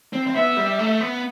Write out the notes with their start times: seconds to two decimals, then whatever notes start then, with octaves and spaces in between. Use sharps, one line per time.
0.13 C4
0.27 C4
0.35 B3 E5
0.57 G3
0.79 A3
1.01 B3